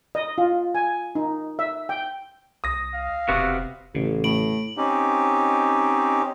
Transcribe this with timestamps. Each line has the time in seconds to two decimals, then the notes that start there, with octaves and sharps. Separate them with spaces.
0.15 D#5
0.38 F4
0.75 G#5
1.15 D#4
1.59 E5
1.89 G5
2.64 C2 D#6 A#6
2.94 F5
3.28 E1 C3 B3 F#4
3.94 A1 C#3
4.24 A2 D7 F#7
4.77 C4 C#4 D#4 G4